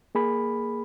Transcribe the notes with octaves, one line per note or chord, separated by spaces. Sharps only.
A#3 G#4 B5